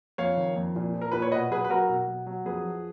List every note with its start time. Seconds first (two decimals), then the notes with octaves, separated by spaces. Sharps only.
0.18 F2 C#5 F5
0.37 D#3
0.56 F2
0.76 A#2
0.94 F3
1.01 A#4
1.12 A#2 B4
1.22 C#5
1.32 B2 B4 D#5
1.50 F#3 G#4 B4
1.64 B4
1.69 F#3 F#4 A#4
1.89 B2
2.07 F#3
2.26 F#3
2.45 F2 G#4 B4
2.65 F3